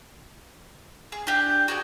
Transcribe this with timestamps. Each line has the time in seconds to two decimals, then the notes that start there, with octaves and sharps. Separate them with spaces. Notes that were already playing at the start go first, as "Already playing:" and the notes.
1.12 G#4
1.27 D4 G4 G6
1.68 F#4 G#4 D5